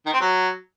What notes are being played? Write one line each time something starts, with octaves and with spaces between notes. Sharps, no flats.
D#3
C4
F#3